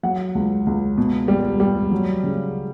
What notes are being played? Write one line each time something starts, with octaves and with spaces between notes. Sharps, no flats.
F#3 F#5
C#2
C#2
B2
G3
G3
F#3
C#3